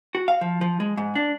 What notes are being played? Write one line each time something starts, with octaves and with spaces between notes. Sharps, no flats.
F#4
F5
F3
F3
G#3
G#2
D4